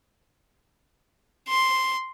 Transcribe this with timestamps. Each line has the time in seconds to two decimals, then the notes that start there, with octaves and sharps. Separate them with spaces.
1.48 C6